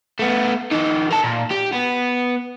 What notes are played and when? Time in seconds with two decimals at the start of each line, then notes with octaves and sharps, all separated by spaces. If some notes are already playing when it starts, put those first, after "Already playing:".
0.19 A3 B3
0.72 E3 D#4
1.11 A#4 A5
1.24 A#2
1.50 G4
1.72 B3